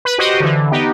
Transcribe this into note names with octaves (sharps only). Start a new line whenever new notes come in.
B4
F#4 G4 C5 D#5
D3 E3
B3 D#4 G4